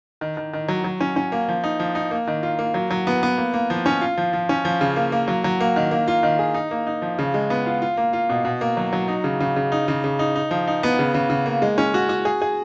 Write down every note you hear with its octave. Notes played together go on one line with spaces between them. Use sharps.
D#3
D#3
D#3
F#3
F#3
C#4
C#4
A#3
F3
D#4
F3
D#4
A#3
D#3
F4
A#3
F#3
F#3
B3
B3
A#3
A#3
F3
C#4
F4
F3
F3
C#4
F3
C#3
A#3
A#3
F#3
F#3
A#3
D#3
A#3
F4
D#3
G#4
D#4
A#3
D#4
F3
C#3
G#3
B3
F4
F4
A#3
F4
B2
B2
A#3
F#3
F#3
D#4
C#3
C#3
C#3
D#4
C#3
C#3
D#4
D#4
F3
D#4
B3
C#3
C#3
C#3
A#3
G#3
C#4
F#4
F#4
G#4
G#4